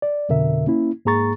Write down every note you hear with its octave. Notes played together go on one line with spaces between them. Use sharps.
D5
F2 B2 D3 A#4 E5
A#3 C#4 E4
G#2 A#3 G#4 A#5 C#6 A6